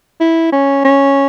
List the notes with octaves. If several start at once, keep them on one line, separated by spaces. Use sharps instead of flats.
E4
C#4
C#4